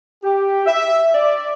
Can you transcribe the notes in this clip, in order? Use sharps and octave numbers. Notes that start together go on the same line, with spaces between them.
G4
E5
D5